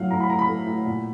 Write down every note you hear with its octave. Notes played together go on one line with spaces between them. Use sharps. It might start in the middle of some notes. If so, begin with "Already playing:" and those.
Already playing: A2 F#3 A3 F5 F#5
A2 A#5
B5
A2 A#5
B5
A3
A2
A#2